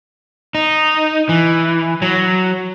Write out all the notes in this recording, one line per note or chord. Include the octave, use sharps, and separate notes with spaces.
D#4
E3
F#3